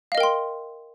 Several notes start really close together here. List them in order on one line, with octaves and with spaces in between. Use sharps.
F5 D#5 A#4 G5 C6